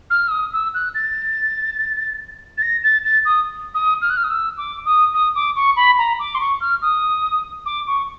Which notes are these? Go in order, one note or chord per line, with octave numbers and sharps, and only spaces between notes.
F6
E6
D#6
E6
F#6
A6
A6
A#6
A6
A6
D#6
D#6
F6
F#6
F6
D#6
E6
D6
D#6
D#6
D6
C#6
B5
A#5
D6
C6
C#6
F6
D#6
D6
C#6